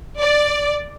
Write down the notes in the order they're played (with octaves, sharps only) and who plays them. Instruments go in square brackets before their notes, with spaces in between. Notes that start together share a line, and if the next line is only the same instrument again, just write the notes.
[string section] D5